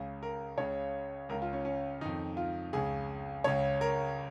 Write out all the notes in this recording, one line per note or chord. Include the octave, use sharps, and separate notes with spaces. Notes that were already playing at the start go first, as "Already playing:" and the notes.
Already playing: C#2 C#3
A#4
C#2 C#3 C#5
C#2 C#3 A#4
F4
C#4
C#4
F2 D#3 D#4
F4
C#2 C#3 G#4
C#2 C#3 C#5
A#4